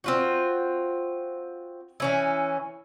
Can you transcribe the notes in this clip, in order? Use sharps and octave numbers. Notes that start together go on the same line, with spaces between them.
C4 F4 F#4
E3 C#4 E4